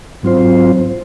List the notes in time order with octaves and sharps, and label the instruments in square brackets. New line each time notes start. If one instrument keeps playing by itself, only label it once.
[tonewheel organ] G#2 F#3 C4 F4 C5